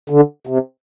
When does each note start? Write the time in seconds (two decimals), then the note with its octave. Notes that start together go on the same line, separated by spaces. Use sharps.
0.10 D3
0.47 C3